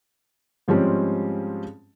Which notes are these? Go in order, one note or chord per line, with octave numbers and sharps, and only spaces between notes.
G#2 F3 G3 G#3 C4 C#4